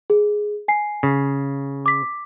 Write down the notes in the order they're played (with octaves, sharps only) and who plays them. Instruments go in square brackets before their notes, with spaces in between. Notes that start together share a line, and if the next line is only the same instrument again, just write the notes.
[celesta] G#4
G#5 C7
[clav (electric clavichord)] C#3
[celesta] D6 B6